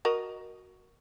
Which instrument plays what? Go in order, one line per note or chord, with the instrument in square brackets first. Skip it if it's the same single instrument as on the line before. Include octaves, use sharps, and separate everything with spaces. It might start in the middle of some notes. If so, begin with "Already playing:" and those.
[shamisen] F#4 A#4 D#5